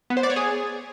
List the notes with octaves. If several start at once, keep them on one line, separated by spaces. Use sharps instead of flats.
B3
C5
D5
C#5
G#4